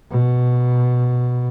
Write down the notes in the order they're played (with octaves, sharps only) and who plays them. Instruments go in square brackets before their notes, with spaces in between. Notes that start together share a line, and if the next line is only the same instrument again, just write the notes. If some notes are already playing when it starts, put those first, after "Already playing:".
[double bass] B2